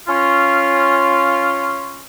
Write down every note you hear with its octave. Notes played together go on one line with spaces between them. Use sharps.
C#4 F4